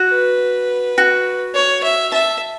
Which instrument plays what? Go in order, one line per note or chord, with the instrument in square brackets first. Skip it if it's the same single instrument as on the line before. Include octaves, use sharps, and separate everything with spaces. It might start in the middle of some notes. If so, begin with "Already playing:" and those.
Already playing: [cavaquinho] F#4
[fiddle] B4
[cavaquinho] F#4
[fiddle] C#5
E5
[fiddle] E5 [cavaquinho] A5